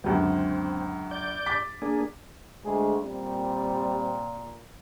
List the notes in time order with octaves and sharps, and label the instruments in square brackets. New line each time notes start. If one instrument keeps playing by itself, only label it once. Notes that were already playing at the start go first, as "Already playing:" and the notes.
[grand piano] C#2 F#2 D3 [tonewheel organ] B3 G4
[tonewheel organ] C4
D5 G6
[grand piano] D6 A6 B6
[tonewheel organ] A#3 D4 G#4
[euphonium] D2 [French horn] G#3 [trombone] G#4
[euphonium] A#2 [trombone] G3 [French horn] C4